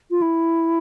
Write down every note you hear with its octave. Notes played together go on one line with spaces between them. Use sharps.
F4
E4